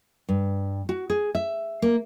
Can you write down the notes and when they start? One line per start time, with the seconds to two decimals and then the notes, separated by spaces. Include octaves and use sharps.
0.29 G2
0.89 F#4
1.10 G#4
1.35 E5
1.82 A#3